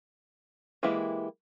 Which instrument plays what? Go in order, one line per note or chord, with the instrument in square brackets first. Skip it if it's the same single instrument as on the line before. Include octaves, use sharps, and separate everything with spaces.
[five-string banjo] E3 G#3 A#3 E4 G4